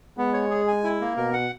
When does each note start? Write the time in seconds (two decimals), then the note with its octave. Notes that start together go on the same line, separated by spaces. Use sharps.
0.18 G#3 B3
0.33 C#5
0.50 G#4
0.67 G#5
0.84 E4
1.01 A#3
1.17 B2 A#4
1.33 F#5